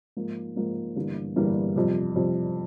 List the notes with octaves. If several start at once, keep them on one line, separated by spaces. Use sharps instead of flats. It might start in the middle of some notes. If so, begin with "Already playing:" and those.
G#2 F3 A#3
G#2 F3 A#3
G1 G2 E3 G3 A#3
G1 G2 E3 G3 A#3
F2 C3 G3
F2 C3 G3